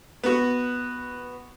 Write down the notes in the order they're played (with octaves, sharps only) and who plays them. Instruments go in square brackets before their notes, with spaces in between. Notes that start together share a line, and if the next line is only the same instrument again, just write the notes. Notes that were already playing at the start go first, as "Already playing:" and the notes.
[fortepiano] B3 F#4